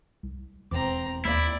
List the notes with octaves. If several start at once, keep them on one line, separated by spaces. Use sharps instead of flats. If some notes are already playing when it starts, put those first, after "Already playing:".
C2
E1 E2 C4 A#5 D6
D#2 A#3 E4 D5